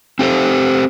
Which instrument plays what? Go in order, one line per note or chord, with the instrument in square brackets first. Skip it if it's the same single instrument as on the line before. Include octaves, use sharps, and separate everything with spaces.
[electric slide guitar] C4 G4 A4 C5